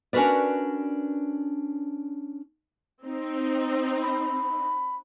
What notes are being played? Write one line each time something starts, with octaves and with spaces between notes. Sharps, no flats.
C#4 D4 F#4 A#4 B4 D5
C4 D#4
B5